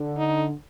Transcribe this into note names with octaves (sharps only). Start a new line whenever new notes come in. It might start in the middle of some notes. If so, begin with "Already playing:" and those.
Already playing: D3
D#4